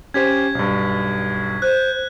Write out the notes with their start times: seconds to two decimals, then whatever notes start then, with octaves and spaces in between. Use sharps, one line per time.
0.14 C#4 G4 C5 G#6 B6
0.55 B1 G2
1.62 C5 F#6